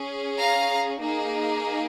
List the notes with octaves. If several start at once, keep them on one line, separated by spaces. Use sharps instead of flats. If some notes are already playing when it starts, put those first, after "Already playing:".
Already playing: C#4 G#4
F5 A#5
A#3 D#4 G#4